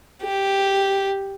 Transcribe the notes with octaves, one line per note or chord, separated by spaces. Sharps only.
G4